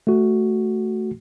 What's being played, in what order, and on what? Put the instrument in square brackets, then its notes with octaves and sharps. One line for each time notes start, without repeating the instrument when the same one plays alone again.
[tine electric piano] A3 F#4